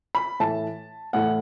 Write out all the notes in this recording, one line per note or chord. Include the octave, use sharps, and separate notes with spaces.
B5
A2 E3 A3 A5
A2 E3 A3 F#5